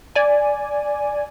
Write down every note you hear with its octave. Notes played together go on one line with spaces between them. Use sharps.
D5 G#5